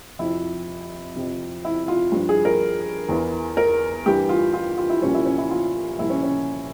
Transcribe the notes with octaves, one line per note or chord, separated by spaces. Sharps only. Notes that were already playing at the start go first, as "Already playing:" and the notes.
F2 C3 F3 E4
F2 C3 F3
E4
F4
G2 F3
G#4
A#4
E2 E3
A#4
G2 E3 G4
F4
F4
F4
E4
C2 A#2 F3 C#4
E4
C#4
E4
F4
C2 A#2 F3 E4
C#4
C#4